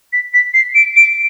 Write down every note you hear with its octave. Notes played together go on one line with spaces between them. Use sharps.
B6
B6
C7
D7
D7